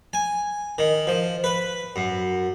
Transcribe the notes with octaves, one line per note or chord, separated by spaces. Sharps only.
G#5
D#3
F3
B4
F#2